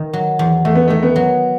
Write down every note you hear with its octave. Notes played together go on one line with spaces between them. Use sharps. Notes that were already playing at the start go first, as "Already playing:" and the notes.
Already playing: D#3
F#3
E2
E2 A3
B3
D#3 A3
B3
F#3